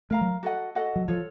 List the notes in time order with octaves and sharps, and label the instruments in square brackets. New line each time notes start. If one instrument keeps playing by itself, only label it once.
[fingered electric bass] A3 [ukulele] A#4 F5 A#5
[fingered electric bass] F#3
[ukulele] F#4 A4 D#5 F#5
F#4 A4 D#5 F#5
[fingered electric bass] F#3
[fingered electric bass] F3 [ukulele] F4 A4 C#5